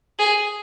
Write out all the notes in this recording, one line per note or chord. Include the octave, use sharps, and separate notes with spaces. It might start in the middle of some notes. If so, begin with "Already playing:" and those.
G#4